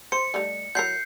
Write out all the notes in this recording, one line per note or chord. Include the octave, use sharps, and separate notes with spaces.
C5 C#7
G3 A3 D#4
F#3 E4 A#4 G6 C7